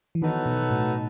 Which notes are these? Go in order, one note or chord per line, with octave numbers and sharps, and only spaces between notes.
E3
D#3 F#3 B3 D#4 F#4 A4
B2
A2